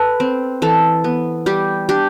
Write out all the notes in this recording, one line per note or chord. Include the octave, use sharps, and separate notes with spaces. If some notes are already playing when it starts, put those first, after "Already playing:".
Already playing: A4 B4
C4
E3 A4
B3
G3 G4
D4 G4